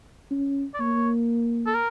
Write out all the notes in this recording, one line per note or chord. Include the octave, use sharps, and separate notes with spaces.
C#4
D5
A#3 C#5
A4
A#4